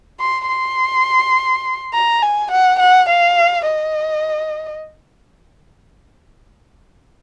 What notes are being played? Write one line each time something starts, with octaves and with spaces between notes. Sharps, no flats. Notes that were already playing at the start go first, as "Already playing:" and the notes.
C6
C6
A#5
G#5
F#5
F#5
F5
D#5